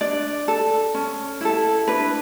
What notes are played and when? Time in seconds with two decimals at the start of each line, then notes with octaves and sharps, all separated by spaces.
0.01 D4 D5
0.48 A4
0.94 C#4
1.41 E4 A4
1.88 D4 B4